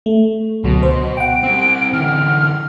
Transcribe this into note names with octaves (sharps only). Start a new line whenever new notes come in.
A3
C#2 B2 D3 F#3
C5
F#5 G5 D7
G3 C4
D3 E3 F6